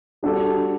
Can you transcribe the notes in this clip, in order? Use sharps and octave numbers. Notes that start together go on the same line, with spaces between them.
G3 D4 F#4 A4